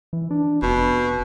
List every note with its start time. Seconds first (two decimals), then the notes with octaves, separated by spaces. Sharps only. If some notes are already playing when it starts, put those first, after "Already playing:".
0.13 E3
0.31 D4
0.62 F1 B2